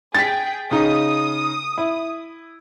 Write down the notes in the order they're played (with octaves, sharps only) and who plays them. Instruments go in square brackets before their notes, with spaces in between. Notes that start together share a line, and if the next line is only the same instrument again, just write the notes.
[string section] G#4 G5 [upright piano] A6 B6
[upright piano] C#3 D#4 [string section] D#6
[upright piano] E4